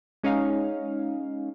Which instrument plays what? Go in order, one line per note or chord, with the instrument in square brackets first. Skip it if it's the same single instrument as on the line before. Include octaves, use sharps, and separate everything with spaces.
[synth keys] G#3 C#4 D#4 F5